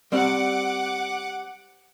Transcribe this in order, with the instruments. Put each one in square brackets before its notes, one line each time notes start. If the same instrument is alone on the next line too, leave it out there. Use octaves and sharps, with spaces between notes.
[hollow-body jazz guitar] G3 C4 D5 [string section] F#5 D6